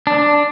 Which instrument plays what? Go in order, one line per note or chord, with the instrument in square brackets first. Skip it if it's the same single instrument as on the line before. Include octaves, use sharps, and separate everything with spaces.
[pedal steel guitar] D4